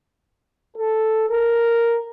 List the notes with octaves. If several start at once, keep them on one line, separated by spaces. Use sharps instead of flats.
A4
A#4